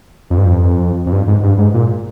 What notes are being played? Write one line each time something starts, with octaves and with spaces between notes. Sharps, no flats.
F2
G2
F2
F2
G2
G#2
G2
G#2
A#2